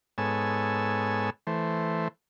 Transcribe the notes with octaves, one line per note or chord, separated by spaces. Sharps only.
G#2 B3 A4 C#5 G#5 E6
E3 A3 C5